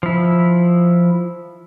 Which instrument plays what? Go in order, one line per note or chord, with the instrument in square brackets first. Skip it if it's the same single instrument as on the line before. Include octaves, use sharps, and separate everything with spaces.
[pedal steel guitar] F3 E4